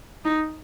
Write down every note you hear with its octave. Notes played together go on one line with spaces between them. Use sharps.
D#4